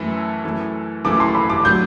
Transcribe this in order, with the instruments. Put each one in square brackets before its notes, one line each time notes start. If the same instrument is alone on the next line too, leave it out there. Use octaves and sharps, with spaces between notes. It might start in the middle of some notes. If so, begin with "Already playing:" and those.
Already playing: [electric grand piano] F#2 E3 A3 E4 A4
F#2 E3 A3 E4 A4
[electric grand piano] F#2 E3 A3 E4 A4 [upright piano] D6
[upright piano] C6
B5
D6
[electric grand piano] F#3 A3 D4 [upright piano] G6